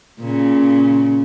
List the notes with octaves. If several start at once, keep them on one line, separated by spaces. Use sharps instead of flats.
A#2 C#3